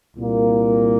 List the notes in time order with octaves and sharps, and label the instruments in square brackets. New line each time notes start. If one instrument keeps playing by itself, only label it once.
[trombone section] C2 A#2 A#3